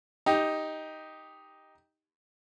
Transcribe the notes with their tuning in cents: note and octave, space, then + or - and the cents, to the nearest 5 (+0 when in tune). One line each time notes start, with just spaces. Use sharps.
D#4 +5 G4 +10